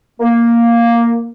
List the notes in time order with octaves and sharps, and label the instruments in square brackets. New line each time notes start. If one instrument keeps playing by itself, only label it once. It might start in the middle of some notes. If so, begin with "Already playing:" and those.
[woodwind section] A#3